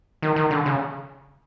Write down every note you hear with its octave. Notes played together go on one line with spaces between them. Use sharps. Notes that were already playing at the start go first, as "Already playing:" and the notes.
D#3
D#3
D3
C#3